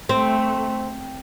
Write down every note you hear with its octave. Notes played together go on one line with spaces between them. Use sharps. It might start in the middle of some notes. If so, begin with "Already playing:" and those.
A3 C4